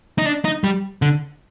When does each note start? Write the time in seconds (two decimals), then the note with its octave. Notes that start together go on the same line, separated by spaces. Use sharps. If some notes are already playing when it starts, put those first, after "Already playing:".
0.18 D#4
0.26 D4
0.45 D#4
0.64 G3
1.02 D3